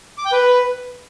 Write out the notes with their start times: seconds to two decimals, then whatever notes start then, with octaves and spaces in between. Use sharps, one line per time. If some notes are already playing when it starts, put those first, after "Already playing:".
0.18 D6
0.25 G5
0.32 B4